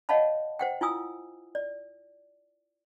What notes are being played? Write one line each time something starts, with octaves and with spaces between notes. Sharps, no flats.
C#5 D#5 F5 F#5 A5 B5
C5 F#5 G5
E4 F4 G#5 D#6 E6
D5